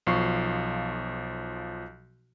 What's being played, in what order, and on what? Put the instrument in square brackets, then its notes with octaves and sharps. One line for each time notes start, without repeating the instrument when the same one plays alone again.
[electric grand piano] B1 F3 F5 C#6 C7